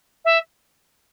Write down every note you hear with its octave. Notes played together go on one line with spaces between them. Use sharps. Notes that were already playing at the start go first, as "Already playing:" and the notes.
E5